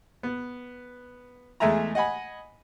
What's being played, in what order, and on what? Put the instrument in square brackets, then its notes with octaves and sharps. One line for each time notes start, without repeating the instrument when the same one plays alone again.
[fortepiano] B3
E2 G#3 A3 E5 G#5 A#5
D#5 F#5 G#5 B5